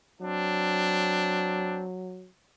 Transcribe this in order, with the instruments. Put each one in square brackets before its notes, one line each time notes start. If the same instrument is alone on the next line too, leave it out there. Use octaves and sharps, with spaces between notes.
[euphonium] F#3 [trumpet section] C4 D4